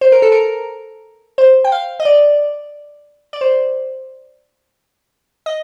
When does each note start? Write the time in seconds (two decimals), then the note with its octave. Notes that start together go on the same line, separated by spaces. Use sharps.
0.01 C5
0.12 A#4
0.22 A4
0.32 A#4
1.38 C5
1.64 G5
1.72 F5
2.00 D#5
2.05 D5
3.33 D5
3.41 C5
5.46 D#5